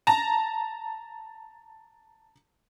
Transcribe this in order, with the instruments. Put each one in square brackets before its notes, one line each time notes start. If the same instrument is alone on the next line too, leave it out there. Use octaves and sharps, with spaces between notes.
[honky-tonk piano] A5 A#5